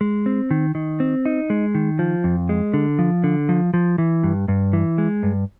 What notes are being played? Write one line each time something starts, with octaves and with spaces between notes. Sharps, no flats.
G#3
C4
D#3
D#3
C4
D#4
G#3
D#3
F3
F2
G#3
D3
F3
D3
F3
F3
E3
G2
G2
E3
G#3
G2